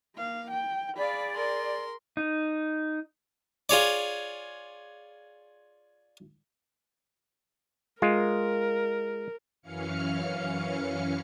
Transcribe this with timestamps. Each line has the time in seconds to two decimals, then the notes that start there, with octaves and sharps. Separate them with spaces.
0.15 A#3 F5
0.52 G5
0.97 G#4 D5 F5 B5
1.34 A#4 C6
2.17 D#4
3.69 F4 G#4 C#5 D5
8.02 G#3 F4 A#4
9.62 F#2 E3 C#4 F5 F6 C#7